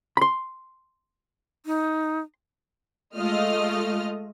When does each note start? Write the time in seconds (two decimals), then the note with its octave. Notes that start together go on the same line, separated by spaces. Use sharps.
0.17 B5 C6
1.66 D#4
3.16 G#3 A3 F4 D#5 F6